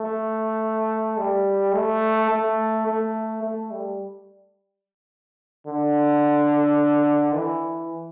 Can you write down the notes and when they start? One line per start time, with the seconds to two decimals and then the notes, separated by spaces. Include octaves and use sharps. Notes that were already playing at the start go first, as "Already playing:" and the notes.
Already playing: A3
1.18 G3
1.75 A3
2.30 A3
2.87 A3
3.43 A3
3.71 G3
5.67 D3
7.35 E3